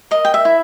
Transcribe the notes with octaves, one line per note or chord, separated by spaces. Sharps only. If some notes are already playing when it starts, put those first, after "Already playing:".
A#4 D#5
G5
E5
E4